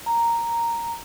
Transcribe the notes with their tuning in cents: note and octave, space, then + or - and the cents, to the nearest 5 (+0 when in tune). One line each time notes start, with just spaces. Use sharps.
A#5 -5